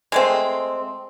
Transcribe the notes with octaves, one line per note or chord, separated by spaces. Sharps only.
G#3 A3 C4